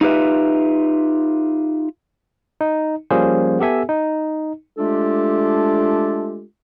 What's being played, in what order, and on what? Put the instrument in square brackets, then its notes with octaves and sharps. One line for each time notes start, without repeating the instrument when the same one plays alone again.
[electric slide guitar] D#4 F4 G4 B4 E5
[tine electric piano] D#4
F3 G3 A#3 C#4 G#4 C5
B3 G4 A4 E5 G#5
D#4
[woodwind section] G#3 A3 D4 F4 G4 A4